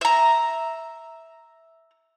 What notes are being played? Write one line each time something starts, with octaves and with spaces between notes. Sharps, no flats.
E5 A#5